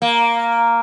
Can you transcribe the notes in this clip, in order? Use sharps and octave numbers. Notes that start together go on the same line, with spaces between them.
A#3